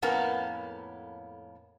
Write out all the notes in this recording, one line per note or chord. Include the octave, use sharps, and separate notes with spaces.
F2 A2 A#3 B3 C#4 A#5